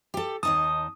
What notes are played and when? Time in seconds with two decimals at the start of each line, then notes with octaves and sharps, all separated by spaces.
0.14 G4 A4
0.43 D#2 D#4 A5 D#6